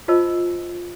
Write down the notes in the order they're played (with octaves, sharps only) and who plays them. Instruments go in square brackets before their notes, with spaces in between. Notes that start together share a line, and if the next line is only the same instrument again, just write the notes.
[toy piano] F4 C5 D#5 A5 E6